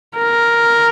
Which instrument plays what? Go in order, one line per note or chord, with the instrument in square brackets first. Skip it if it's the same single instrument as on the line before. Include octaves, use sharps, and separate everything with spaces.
[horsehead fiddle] A#4